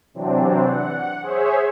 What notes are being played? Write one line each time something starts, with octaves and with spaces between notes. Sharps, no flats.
C3 E3 F#3 C4 D4
F#5
G#4 C5 C#5 E5